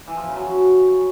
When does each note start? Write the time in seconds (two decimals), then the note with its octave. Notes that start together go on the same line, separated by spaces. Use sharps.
0.08 E3
0.17 F3
0.27 C#3
0.36 F#3